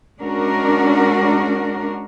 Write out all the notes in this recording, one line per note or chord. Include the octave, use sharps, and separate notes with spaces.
G#3 C#4 D4 F#4 A#4